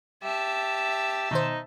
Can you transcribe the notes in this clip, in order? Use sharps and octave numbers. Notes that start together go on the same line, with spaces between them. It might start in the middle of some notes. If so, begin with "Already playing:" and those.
G4 E5 A5
B2 D#3 D#4 C5